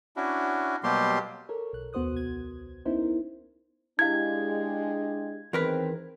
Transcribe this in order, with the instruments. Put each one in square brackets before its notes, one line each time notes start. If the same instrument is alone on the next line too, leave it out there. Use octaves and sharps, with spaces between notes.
[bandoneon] C#4 D4 E4 F#4
B2 F#3 G3 A#3 G4 C6
[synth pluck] A4 A#4 C#5
B1 F#6
D#2 B3 F#4 C5 D#6 F#6
C2 G#6
B3 C#4 D#4 E4 A#4 C5
[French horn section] G#3 D4 G4 [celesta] E4 F5 [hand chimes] G#6
[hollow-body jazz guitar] E2 A#4 B4 [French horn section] D#3 C4